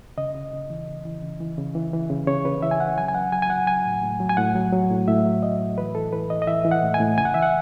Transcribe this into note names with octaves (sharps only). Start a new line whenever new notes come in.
C#3 D#5
C#3
C#3
E3
C#3
E3
C#3
E3
C#3
E3
E3
C#3
C#3 C#5
C#3 B4
E3 E5
G#5
C#3 F#5
F#3 G#5
G#5
F#3 F#5
F#3 G#5
G#5
F#3 F#5
F#3 G#5
A2
A2
F#3
G#5
A2 F#5
F#3
F#3
A2
A2 E5
F#3
F#3 D#5
A2
E3 B4
E3 A4
E3 B4
E3 D#5
D#5
E3 E5
E3
F#5
A2
G#5
A2
C#3 G#5
F#5
E3 E5
F#5